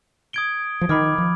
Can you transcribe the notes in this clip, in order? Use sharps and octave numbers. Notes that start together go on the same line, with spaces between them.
D#6 G#6 D7 G7
F3
D#3 B5 D6 F6 G#6
F3